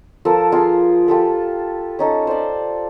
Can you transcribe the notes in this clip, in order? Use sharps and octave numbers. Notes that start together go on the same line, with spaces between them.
F3 A4 A#4
F4 G#4 A#5 C6
F4 G4 A4 B5
C#4 D#4 A4
C5 D5